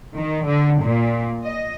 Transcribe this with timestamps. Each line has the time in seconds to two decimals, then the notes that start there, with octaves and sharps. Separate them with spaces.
0.16 D#3
0.46 D3
0.82 A#2
1.44 D#5